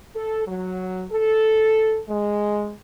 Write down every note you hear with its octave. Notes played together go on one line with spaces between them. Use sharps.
A4
F#3
A4
G#3